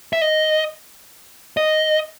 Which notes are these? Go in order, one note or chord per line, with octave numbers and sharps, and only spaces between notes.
E5
D#5
D#5